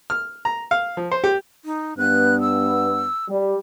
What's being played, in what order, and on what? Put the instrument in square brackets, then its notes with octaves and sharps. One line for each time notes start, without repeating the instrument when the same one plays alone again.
[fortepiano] F6
A#5
F5
F3
C5
G4
[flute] D#4
[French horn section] G2 B3 [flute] F#6
[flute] E6
[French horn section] G3